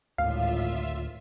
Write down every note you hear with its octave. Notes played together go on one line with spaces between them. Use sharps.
G#1 D2 A2 F4 E5 F5